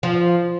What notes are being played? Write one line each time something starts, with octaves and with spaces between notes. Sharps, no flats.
F3